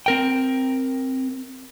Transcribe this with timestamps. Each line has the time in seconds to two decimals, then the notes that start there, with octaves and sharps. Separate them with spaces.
0.06 C4 A#4 G5